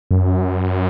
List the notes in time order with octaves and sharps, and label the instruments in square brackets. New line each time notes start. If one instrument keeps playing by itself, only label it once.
[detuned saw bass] F#2